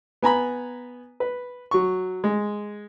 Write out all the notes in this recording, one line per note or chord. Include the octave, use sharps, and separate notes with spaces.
B3 G#5 A#5 B5
B4
F#3 C#6
G#3